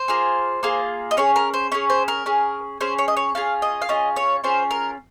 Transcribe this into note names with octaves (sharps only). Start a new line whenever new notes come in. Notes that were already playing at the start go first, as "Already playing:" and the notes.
Already playing: C5
A#3 F4 G#4
A#3 F4 G#4
D#5
C#4 G#4 C#5
A#4
C5
C#4 G#4 C#5
C5
A#4
C#4 G#4
C#4 G#4 C5
C#5
D#5
C#5
C#4 F4 G#4 F5
D#5
F5
C#4 F4 G#4 D#5
C#5
C#4 F4 G#4 C5
A#4